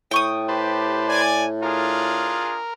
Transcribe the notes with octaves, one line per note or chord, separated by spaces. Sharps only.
A2 G5 C#6 D#6
G4 B4 C5 A5
D5 G#5
D4 F4 G#4 A#4